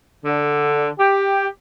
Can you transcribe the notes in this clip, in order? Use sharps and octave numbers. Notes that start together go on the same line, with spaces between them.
D3
G4